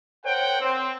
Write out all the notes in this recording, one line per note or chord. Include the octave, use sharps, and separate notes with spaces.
A#4 C5 C#5 F#5 G5
C4